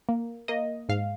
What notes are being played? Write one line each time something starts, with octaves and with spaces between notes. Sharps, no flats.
A#3
A#3 D#5
G#2 F5